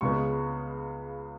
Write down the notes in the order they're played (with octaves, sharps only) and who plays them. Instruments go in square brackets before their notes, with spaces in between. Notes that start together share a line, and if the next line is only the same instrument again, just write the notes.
[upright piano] C#2 C#3 G#3 B3 C#6